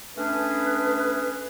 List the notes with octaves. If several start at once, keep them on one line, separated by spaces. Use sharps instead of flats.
A3 C#4 D4 G#4 B4